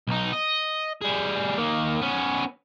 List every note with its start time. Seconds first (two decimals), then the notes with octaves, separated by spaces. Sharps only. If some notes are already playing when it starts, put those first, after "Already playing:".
0.08 B1 D#4
0.33 D#5
1.01 G3 G#4
1.58 D#3 A#3
2.01 B3 C#4